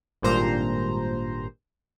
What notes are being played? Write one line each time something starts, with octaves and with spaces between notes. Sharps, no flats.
G#1 G2 A#2 C5 A#5